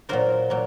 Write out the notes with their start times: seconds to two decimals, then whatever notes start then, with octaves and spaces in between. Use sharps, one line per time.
0.09 A#2 F#3 A#3 A#4 C5
0.50 A#2 F#3 A#3